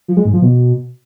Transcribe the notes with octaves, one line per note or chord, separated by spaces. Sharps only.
F3
G#3
G#2
F3
B2